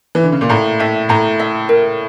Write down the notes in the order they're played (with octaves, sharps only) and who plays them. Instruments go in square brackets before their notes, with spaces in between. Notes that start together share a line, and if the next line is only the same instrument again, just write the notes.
[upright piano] E3
D3
C#3
A#2
[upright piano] A2 [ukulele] A#5
[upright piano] A2 [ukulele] E5
[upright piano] A2 [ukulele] A#5
[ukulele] E5
A#4